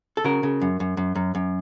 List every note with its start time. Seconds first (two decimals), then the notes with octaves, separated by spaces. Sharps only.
0.17 A4
0.24 C#3 F#4 A#4
0.43 C#3
0.62 F#2
0.80 F#2
0.97 F#2
1.15 F#2
1.35 F#2